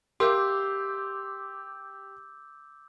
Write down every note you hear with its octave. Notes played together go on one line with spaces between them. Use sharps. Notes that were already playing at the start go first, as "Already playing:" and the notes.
G4 A#4 E5 F5 C6 D6 E6 G6